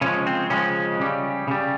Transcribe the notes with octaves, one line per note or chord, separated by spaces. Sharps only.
C#3 F3 G#3 C#4
C4
C#3 F3 G#3 C#4
C#3 G3
C#3 G3